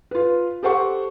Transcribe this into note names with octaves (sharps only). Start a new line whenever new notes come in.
F4 B4
G4 A4 C5 F#5 C#6